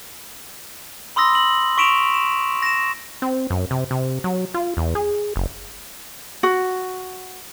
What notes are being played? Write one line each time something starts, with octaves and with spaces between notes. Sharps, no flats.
B5 C6 D#6 E6 A#6
F#7
C#6 B6 D7 E7 F7
E7
A#6 E7
C4
F#2
C3
C3
F#3
F4
E2
G#4
F#1
F#4